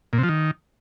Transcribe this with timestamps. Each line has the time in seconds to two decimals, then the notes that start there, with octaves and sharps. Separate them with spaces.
0.13 A#2
0.18 C3
0.23 F3
0.29 D#3